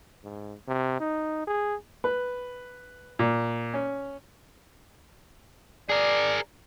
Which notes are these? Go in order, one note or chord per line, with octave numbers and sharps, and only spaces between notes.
G#2
C3
D#4
G#4
B4
A#2
C#4
G#4 A#4 D5